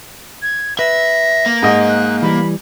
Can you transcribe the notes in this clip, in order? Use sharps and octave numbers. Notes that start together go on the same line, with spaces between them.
G#6
B4 E5 A#6
A#3
G#2 D#5
F#6
E3 G3 B5